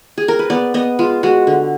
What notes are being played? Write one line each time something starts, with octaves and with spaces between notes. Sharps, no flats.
G#4
A#4
B4
B3 D5
B3 D#5
G#3 F4
G#3 F#4
D3